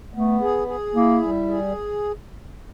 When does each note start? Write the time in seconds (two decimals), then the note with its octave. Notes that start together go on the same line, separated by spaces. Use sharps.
0.14 A3 B3
0.41 G#4
0.68 G#4
0.95 A#3 E4
1.23 G3
1.50 G#4